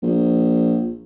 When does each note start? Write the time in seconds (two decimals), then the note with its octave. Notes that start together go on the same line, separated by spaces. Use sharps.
0.02 A#1